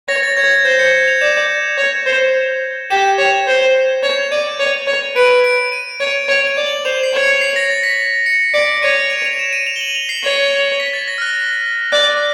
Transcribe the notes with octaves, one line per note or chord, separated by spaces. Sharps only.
C#5 A#6
A6
C#5 G#6
G#6
C5 G6
C#7
F7
D5 E7
C#5
C5
G4 E7
C#5
C5
C#5 F7
D5 D#7
C#5
C#5
B4 D7
D7
D#7
C#5 F7
C#5
F7
D5
F#7
C5 F7
C7
C#5
C#7
C7
A#6
A6
B6
C#7
D5 D7
C#5 D#7
F7
F7
E7
D#7
F7
G7
F#7
F7
C7
C#5
B6
A6
A#6
F6
F#6
D5 F#6